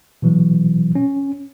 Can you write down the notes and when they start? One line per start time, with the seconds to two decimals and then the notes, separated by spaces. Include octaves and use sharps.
0.22 B2 E3 F#3
0.95 C#4